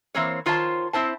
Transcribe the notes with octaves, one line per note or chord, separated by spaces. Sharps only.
E3 A#3 C4 C5 C#5
D#3 F4 C5 C#5 E5 A5
C4 E4 C5 A5